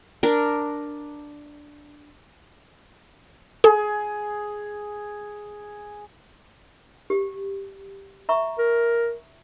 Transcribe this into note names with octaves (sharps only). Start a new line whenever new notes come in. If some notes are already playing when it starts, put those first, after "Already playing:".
D4 A#4
G#4 A4
G4
E5 A#5 C#6
A#4